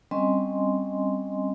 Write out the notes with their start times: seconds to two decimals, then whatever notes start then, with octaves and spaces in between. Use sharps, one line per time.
0.11 G3 C4 C#4 D#5 G#5 C6